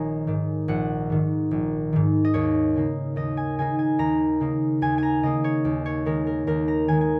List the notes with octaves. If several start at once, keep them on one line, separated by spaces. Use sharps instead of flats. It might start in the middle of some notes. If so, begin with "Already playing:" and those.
Already playing: A#1 D#3 C#5 D#5 G#5 A#5
G#2 D#3
A#1 F#5
G#2 D#3
A#1
G#2 D#3
D#5
D#2 C#5
C#3 A#3 D#4
D#2 D#5
G#5
C#3 A#3 D#4 G#5
G#5
D#2 A#5
C#3 A#3 D#4
D#2 G#5
G#5 A#5
C#3 A#3 D#4 D#5
C#5
D#2
C#5
D#3 G#3 A#4
A#4
D#2 A#4
A#5
D#3 G#3 G#5
G#5